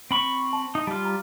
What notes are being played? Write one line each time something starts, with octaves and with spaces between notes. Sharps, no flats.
C4 B5 C#6
A5
D#4
G3 F4 A5
A#5